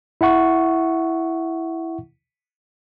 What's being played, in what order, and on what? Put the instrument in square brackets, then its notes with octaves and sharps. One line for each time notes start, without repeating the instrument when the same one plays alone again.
[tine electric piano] E4 E5 F#5 C#6